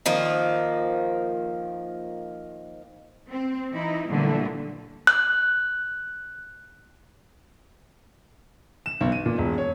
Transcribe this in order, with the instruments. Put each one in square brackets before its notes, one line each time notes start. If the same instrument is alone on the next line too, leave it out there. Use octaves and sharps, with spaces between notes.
[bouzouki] D#3 F3 A#3
[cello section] C4
E3 D#4 E4
A#2 D3 E3 F#3 G3 A3
[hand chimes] F#6
[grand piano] E7
B1
D#7
A#2
E1
C#5